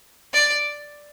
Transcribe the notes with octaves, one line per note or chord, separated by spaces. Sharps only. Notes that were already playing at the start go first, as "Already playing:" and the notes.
D5